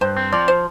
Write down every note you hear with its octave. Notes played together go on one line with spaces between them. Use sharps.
G2 C5
C4
F3 D5
C5